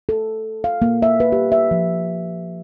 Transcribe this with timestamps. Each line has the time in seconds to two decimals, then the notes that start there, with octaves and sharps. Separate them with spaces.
0.09 A4
0.64 F5
0.82 A#3
1.02 E5
1.20 B4
1.32 G4
1.52 E5
1.71 F3